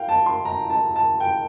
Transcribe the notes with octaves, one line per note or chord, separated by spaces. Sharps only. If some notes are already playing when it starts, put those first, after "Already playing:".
Already playing: F5 G5
A5
C6
A#5
A5
A5
G5